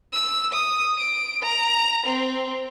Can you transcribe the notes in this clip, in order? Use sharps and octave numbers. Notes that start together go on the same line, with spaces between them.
E6
D#6
D7
A#5
C4